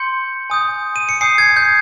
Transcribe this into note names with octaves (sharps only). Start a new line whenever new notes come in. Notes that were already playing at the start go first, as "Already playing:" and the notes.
Already playing: C6 G6 C#7
G#5 D#6 G6
D#7
C#7
G#5 D#6 G6 C7
G#6
G6